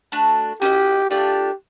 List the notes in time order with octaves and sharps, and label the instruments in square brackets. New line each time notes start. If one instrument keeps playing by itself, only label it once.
[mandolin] A3 D4 F#4
[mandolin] C#4 F#4 B4 D#5 [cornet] G4
[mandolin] A3 D4 F4 [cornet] G4